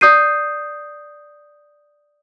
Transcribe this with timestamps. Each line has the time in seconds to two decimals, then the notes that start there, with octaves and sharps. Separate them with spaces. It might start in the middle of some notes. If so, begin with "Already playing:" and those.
0.01 D5 D#6 G6 C7 D#7